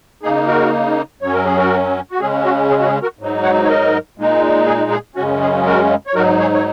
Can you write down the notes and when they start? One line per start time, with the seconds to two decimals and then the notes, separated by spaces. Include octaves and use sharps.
0.23 C#3 A#3 D#4 G#4
0.47 F#4 A#4
1.21 F#2 F#3 C#4 C#5
1.33 A#4
1.45 G#4
1.58 F#4 A#4
2.11 F#4
2.20 C#3 G#3 C#4 G#4
2.44 F#4
2.70 G#4
2.79 F#4
2.86 G#4
3.02 F#4 A#4
3.19 G#2 F#3 D#4
3.43 C#5 F#5
3.64 C#5
3.68 A#4 D#5
4.18 A#2 G#3 D#4
4.66 G#4
4.91 G#4
5.16 F#2 C#3 G#3 C#4 F#4
5.41 G#4
5.66 F#4 A#4
6.07 C#5
6.15 G#2 F#3 D#4 F#4 A#4
6.39 G#4 C#5
6.53 C#5